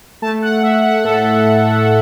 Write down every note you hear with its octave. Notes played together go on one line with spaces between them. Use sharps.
A3 A5
F#5
A3 E5
F#5
A2 A4
A2